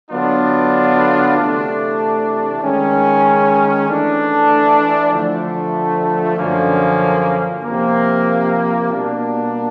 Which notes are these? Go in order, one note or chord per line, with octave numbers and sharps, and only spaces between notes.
D3 F#3 B3 D4 F4
C3 E3 A3 D4
D#3 G#3 C#4
E3 A3 D4
D3 F3 A3
F#2 D3 F3 A#3 C#4
C3 F3 A#3
B2 G3 A#3 D4